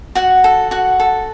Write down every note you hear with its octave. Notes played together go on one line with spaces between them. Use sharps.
F#4 F#5
A4
F#4 F#5
A4